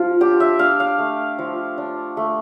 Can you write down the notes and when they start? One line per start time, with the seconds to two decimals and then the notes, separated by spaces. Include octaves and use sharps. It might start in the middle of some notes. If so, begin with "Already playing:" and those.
Already playing: F3 F4
0.21 D4 G4
0.40 E5
0.59 D4 F5
0.80 F5
0.99 A3
1.39 F3
1.78 D4
2.17 A3